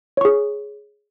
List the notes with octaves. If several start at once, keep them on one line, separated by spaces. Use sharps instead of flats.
G#4 C#5 C#6